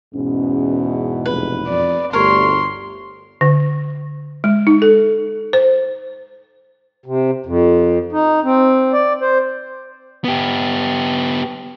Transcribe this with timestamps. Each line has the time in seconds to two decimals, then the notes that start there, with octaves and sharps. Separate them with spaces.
0.15 E2 G#2 B2 C#4
1.26 F1 B4
1.68 F2 D5
2.13 G1 D2 A3 G4 A#4 C#5 C6
3.41 D3
4.44 G#3
4.67 D#4
4.82 A4
5.53 C5
7.06 C3
7.46 F2
8.12 D#4
8.44 C4
8.93 D5
9.21 C5
10.25 B3 G4